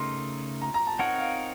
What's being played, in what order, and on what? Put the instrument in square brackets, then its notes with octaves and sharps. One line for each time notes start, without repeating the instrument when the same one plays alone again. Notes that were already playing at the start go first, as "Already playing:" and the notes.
Already playing: [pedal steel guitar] C#3 A3 D#4 A#4 [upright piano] C6
[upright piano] A#5
A#5
A5
[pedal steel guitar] C4 D#4 A#4 C#5 [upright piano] F#5
[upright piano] F5